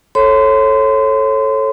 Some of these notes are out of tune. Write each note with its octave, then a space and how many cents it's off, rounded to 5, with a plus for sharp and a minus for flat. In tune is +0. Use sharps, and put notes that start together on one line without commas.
A4 -5 C#5 -25 C6 -30